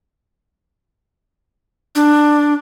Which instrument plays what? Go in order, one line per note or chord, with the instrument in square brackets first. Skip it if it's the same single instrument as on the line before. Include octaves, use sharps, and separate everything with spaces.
[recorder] D4